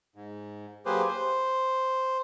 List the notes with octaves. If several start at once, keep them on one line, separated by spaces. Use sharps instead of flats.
G#2
F#3 A#3 G4 G#4 B4 C5
C5